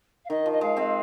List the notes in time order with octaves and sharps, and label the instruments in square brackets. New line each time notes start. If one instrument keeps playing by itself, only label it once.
[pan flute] F5
[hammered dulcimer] D#3 [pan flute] D#5
[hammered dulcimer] F3
[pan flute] D#5
[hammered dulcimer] G#3 [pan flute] F5
[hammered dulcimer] G#3 C4